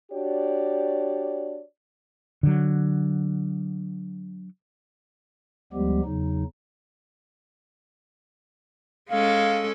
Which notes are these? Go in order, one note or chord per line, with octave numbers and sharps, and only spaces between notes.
D4 F#4 G4 C#5 D5
D3 F#3
D2 F3 G3 G#3 B3 G4
E2 C#3 F#3 D#4
G#3 C#4 A4 F5